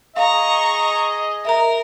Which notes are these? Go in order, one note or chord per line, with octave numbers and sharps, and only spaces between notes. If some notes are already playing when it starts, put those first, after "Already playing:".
G#4 D#5 F5 A#5 C#6
A#4 E5 A#5